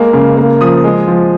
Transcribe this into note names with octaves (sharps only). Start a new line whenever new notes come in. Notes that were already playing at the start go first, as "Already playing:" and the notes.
Already playing: G#3 A#3
C#3
A#3
F3 D#6
G#3
F3